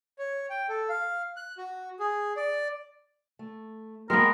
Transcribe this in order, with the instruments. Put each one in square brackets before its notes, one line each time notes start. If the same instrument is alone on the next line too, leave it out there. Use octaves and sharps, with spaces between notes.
[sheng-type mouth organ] C#5
G5
A4
F5
F#6
F#4
G#4
D5
[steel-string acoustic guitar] A3
[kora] G#3 B3 [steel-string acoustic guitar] A#3 B4 G5 [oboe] A#4